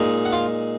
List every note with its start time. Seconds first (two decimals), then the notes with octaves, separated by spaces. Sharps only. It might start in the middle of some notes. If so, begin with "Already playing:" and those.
Already playing: A#2 G#3 D#4
0.25 F#5
0.33 F4 F5